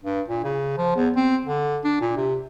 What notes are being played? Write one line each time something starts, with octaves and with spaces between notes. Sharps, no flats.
G2
A#2
C#3
F3
E2
C4
D3
D4
A#2
C3